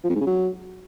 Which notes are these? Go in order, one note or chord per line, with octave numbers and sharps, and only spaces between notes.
F3
F2
G#2
C#3
F#3